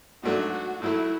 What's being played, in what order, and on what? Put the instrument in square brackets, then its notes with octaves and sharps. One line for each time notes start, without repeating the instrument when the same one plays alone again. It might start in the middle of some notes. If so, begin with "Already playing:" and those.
[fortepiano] G#2 F#3 A3 D4 [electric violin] F#4
[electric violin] F#4
[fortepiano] A2 F#3 A3 [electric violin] E4